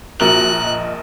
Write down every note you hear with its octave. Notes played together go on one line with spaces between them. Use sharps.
A#1 F#4 A#4 F#6 F#7
D#5